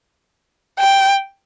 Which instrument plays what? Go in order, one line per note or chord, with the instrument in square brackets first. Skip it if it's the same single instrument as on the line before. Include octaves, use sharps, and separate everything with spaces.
[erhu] G5